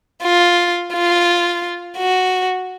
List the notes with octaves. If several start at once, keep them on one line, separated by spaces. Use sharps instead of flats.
F4
F4
F#4